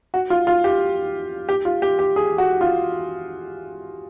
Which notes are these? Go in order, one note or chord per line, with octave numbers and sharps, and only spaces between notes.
F#4
F4
F4
G4
G4
F4
G4
G4
G#4
F#4
F4